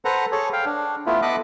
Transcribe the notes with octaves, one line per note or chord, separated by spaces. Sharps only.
A4 B4 C5 F#5 A#5
G#4 A4 C#5
F5 G5
D4
A3 B3 E4 F4
B3 A4 D#5 B5 D6 F#6